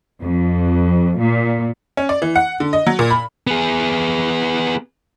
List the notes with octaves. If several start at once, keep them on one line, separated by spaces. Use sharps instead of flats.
F2
A#2
C#4
D5
E3
F#5
D3
D#5
F#3
A#2
B5
B3 G#4